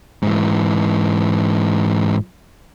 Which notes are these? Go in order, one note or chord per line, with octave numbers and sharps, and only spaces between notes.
G#2 E3